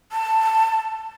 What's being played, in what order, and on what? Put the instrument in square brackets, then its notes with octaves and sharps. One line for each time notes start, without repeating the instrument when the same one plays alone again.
[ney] A5